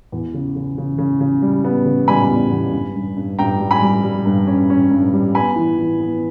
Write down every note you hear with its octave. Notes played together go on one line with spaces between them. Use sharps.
E2
C#3
C#3
C#3
C#3
C#3
G3
B3
C#3
G3 G#5 B5
E2
E2
G2
G2
G2
G2 G5 A#5
G3
G#5 B5
G3
G3
G2
C#4
C#4
G2
G3
B3 G#5 B5
E3
E3
B3